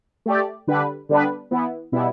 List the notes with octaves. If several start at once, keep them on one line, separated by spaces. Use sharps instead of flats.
A3 G4 D5
D3 G3 D4 B4
D3 G3 B3 D4 B4
E3 B3 E4
B2 G3 B3 E4